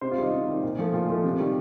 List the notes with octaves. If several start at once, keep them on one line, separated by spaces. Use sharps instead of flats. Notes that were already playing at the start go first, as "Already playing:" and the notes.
C3 C5
F4
D#3 G3 D#4
C3
D#3 G3
A#2
F3 A3
A#2 F4
F3 A3
C3
D#3 G3